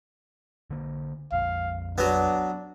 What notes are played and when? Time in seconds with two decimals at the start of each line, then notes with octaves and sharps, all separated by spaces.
0.71 D3 A#3
1.32 A#1 F2 F5
1.98 F#3 B3 D4